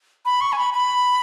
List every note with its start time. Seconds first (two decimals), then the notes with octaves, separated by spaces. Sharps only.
0.26 B5
0.41 C#6
0.52 G#5
0.58 B5
0.74 B5